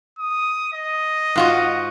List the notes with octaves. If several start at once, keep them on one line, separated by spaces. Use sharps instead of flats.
D#6
D#5
G#2 F4 F#4